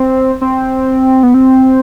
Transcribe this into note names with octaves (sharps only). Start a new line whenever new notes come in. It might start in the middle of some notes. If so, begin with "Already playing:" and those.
Already playing: C4
C4
B3
C4